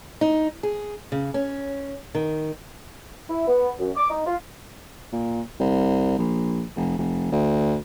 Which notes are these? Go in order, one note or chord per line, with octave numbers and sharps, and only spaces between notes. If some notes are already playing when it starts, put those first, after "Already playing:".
D#4
G#4
C#3
C#4
D#3
E4
B3
F#2
D6
D#4
F4
A#2
C2
A#1
F1
F1
D2